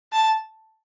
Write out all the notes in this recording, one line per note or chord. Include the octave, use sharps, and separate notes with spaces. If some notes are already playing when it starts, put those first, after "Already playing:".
A5